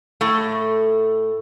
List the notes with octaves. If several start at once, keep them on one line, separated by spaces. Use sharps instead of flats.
A2 A3